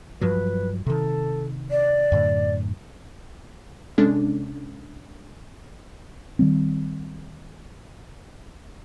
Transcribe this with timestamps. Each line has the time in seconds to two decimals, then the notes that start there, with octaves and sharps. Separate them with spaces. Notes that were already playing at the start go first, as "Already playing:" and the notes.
0.21 G2 F3 F#3 B4
0.86 C3 D#3 A4
1.71 D5
2.12 F#2 A2 D3
3.98 C3 G#3 C#4 D4 A4
6.39 D#3 G3 C4